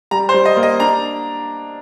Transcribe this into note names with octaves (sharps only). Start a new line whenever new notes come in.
G3 A#5
C5
G3
D#5
A#3
D#5
D4 A#5